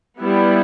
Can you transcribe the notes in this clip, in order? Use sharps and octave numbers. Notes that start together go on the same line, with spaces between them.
G3 B3 E4